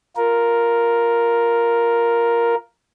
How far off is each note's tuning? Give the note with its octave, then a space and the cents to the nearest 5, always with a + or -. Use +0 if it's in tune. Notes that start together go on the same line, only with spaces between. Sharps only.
F4 +0 A#4 +0